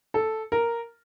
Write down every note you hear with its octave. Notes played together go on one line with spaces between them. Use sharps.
A4
A#4